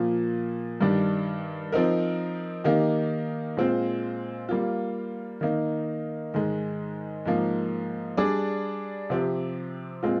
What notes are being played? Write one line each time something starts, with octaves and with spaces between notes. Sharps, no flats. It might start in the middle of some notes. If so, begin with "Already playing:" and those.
Already playing: A#2 F3 A#3
G2 D#3 G3 D4
F3 C4 D#4 A#4
D#3 A#3 D#4 G4
A#2 G#3 C4 F4 C5
G3 A#3 F4
D#3 A#3 D#4
G#2 D#3 G#3
G#2 F3 A#3
G3 D4 G#4 D5
C3 F3 C4 G4
A#2 G#3 C4 F4